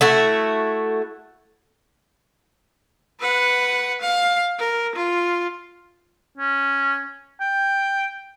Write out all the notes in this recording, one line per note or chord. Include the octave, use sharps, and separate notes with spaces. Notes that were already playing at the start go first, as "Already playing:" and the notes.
A3 E4 F#4
B4 F#5
F5
A#4
F4
C#4
G5